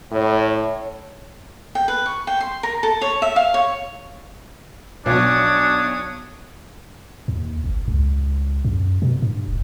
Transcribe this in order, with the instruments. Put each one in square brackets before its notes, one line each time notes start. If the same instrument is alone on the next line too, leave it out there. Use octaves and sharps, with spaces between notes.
[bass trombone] A2 [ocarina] C#5
[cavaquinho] G5
B4
C#6
G5
C6
A#4
A4
C#5
E5
F5
C#5
[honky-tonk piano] B1 B2 F#3 [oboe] D4 [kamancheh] C#5 D#6
[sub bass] D#2
G1
C#2
F#2
B2
G2
D#1